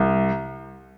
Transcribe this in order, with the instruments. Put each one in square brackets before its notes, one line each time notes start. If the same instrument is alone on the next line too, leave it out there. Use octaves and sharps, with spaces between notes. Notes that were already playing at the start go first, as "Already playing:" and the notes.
Already playing: [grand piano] C2